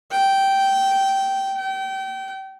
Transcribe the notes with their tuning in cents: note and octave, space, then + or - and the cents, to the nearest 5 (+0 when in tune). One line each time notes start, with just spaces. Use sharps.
G5 -10
G5 -30